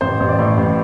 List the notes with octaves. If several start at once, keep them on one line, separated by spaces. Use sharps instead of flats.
A1 C5
A1
D5
A2
A1